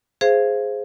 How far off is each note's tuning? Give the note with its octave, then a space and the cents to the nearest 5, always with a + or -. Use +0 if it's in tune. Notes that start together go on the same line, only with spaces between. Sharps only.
G#4 +0 C5 +0 F5 -30